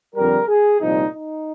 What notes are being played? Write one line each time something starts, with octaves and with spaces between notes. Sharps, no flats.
F2 D3 G3 A#4
G#4
C2 A#2 F3 D#4
D#4